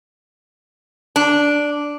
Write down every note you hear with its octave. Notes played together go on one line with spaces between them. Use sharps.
D4